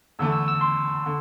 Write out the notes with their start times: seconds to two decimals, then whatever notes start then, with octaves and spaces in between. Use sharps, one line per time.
0.19 E2 D3 A3 E6
0.32 E6
0.48 E6
0.61 C6
1.06 D3